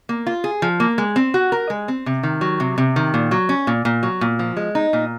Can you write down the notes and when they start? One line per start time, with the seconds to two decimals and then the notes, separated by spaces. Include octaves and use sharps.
0.09 A#3
0.27 F4
0.44 G#4
0.62 F3
0.80 A#3
0.98 G#3
1.16 C4
1.34 F#4
1.52 A#4
1.70 G#3
1.88 C4
2.06 C3
2.23 D#3
2.41 F#3
2.60 C3
2.78 C3
2.96 D#3
3.14 A#2
3.31 F#3
3.49 C#4
3.67 A#2
3.85 A#2
4.03 F#3
4.21 A#2
4.39 F3
4.57 G#3
4.75 D#4
4.93 A#2